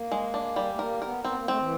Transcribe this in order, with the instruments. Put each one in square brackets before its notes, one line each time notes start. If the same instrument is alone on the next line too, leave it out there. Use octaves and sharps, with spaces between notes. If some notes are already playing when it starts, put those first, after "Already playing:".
Already playing: [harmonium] A#3
[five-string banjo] G#3
D4
G3
[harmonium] A3
[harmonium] A#3 [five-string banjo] A#4
[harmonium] B3 [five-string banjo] A#4
[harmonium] B3 [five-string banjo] C4
[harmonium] A#3
[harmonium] A3 [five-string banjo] C4
[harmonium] E3